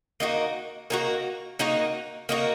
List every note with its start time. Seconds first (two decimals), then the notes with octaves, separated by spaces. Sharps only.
0.20 A#3 D#4 F#4
0.90 A#3 D#4 F#4
1.59 A#3 D#4 F#4
2.29 A#3 D#4 F#4